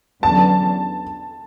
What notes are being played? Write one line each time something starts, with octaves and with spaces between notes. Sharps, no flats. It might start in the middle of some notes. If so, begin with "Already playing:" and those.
E2 D3 F#3 C#4 A5